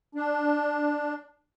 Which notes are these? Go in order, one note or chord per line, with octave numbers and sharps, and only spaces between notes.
D4